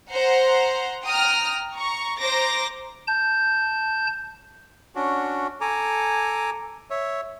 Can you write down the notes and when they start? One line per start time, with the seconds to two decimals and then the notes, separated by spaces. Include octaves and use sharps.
0.11 C5 F#5 A#5
1.05 G5 A#5 D#6 F6
1.76 A#5 C#6
2.19 C5 A#5 D6 A#6
3.07 A5 G6
4.95 C#4 D4 F#4
5.61 A4 G#5 A#5 D6
6.90 C#5 E5